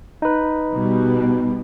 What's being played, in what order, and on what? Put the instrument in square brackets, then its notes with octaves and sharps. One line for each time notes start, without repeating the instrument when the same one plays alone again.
[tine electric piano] D#4 B4
[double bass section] B2 G3